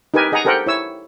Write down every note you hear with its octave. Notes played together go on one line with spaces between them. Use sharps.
D#4 G4 A#4 B4 G#5
G#4 D#5 F#5 G#5 A#5
G4 A4 A#4 C5 F#5 G5
E4 C#5 E6